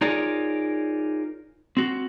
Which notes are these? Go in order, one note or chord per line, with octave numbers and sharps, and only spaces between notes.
D#4 F4 G#4 A#4 C#5 D5
C4 F#4